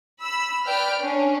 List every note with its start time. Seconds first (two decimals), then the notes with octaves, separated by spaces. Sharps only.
0.22 B5 E6
0.66 B4 D5 G5 F6
1.00 C#4 D4